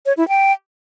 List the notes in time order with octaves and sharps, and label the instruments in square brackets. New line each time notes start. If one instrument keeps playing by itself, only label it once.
[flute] C#5
E4
G5